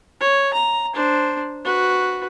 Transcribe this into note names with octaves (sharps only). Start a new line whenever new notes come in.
C#5
A#5
D4 C5
F#4 B4